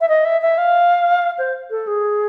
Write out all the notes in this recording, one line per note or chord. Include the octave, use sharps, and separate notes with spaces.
E5
D#5
E5
E5
F5
C5
A4
G#4